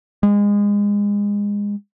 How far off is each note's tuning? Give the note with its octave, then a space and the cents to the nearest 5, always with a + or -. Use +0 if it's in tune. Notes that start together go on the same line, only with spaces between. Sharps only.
G#3 -25